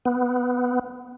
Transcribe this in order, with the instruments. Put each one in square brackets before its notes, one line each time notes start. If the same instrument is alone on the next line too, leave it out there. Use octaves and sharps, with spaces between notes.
[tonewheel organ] B3